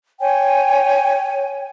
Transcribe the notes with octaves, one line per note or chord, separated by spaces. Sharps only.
C#5 G5 G#5